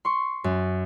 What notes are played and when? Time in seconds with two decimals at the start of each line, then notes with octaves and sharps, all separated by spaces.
0.05 C6 C#6
0.44 F#2